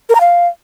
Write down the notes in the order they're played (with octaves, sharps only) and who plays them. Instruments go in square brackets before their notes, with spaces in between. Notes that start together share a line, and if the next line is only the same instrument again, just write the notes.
[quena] A#4
A#5
F5